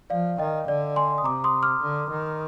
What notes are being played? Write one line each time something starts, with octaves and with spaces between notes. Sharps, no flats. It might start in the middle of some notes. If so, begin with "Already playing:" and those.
F3 D5 F5
D#3 D#5 G5
D3 D5
G#5 C6
D#6
C3 A#5 D6
C6 D#6
D6 F6
D3
D#3